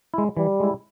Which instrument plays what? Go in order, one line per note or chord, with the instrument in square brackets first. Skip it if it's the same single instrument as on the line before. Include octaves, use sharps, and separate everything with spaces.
[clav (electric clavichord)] G#3 E4
[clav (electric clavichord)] E3 [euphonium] G3
[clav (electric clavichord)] G#3 E4